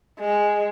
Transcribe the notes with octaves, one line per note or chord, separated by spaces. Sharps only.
G#3